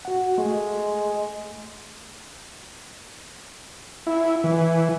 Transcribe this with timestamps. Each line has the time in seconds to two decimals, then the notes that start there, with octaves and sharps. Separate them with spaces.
0.05 F#4 F#5
0.38 G#3 A3
4.07 E4
4.44 E3